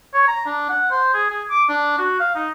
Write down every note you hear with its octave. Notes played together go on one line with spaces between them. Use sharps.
C#5
A#5
D4
F#5
C5
G#4
G#4
D6
D4
F#4
F5
D#4